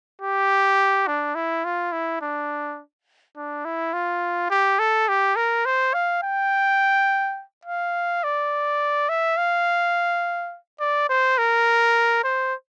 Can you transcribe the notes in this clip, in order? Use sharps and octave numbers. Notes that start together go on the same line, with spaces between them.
G4
D4
E4
F4
E4
D4
D4
E4
F4
G4
A4
G4
A#4
C5
F5
G5
F5
D5
E5
F5
D5
C5
A#4
C5